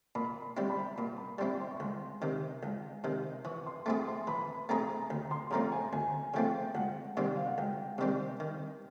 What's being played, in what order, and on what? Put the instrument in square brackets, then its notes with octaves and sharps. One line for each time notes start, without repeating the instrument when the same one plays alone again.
[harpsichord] A#2 [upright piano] B5
[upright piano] C6
[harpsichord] G3 C4 E4
[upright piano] B5
[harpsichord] A#2
[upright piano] B5
[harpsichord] G3 C4 E4 [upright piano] C6
[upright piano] C6
C#6
[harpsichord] C#2 [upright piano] C6
[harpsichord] C3 D#3
C#2
C3 D#3
[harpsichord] E3 [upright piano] C#6
[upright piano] C6
[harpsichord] A3 C4 E4 G#4 [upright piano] C6
[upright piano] C6
[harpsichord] E3 [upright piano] B5
[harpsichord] A3 C4 E4 G#4 [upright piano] A#5
[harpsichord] D2
[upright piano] C6
[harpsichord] C#3 F3 A3 C4 [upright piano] A#5
[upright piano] G#5
[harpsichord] D2 [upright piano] G#5
[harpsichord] C#3 F3 A3 C4 [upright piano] G5
[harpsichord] C#2 [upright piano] F#5
[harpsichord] C3 D#3 G3 C4
[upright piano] F5
F#5
[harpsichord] C#2 [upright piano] G5
[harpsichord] C3 D#3 G3 C4
D#3